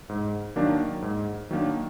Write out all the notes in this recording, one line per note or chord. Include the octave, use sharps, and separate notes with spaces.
G#2
D#3 F#3 A#3 D4
G#2
D#3 F#3 A#3 D4